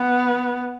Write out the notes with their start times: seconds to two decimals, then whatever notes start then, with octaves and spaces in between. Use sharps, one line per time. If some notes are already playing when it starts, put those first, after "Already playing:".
Already playing: B3